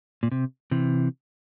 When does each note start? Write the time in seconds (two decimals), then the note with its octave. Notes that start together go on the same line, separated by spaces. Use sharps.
0.23 A#2
0.32 C3
0.71 C3 E3